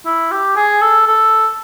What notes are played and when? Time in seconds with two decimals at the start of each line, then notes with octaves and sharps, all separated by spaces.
0.06 E4
0.31 G4
0.56 G#4
0.81 A4
1.07 A4